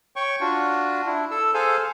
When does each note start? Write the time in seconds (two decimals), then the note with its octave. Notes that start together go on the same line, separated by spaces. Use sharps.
0.16 C#5 G5 C#6
0.40 D4 F4 F#4
1.06 D4 E4
1.31 A4 E6
1.54 G#4 A4 C5 F5 G#5